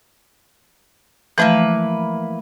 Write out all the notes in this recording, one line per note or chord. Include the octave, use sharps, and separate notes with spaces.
E3 F3 A3 A#3 E4 B4